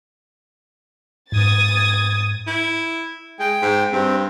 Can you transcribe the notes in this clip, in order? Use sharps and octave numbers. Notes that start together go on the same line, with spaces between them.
G#2 D#6 G#6 A6
E4
G#3 G5
G#2
G2 C4